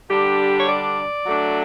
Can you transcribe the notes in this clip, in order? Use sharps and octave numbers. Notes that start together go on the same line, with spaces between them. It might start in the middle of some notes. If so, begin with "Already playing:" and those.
D3 G3 D4 G4
C#5
D5
F#3 A3 D4